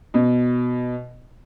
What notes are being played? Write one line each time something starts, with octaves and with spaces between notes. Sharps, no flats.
B2